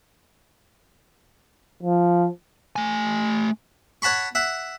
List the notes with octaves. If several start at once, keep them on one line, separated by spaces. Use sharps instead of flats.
F3
A3 G#5
C#5 F#5 A5 B5 C#6
E5 F#5